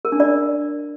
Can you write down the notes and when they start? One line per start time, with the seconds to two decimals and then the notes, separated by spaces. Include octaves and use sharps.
0.05 A#4
0.12 D4
0.20 D5